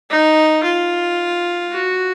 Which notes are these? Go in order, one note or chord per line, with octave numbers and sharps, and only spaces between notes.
D#4
F4
F#4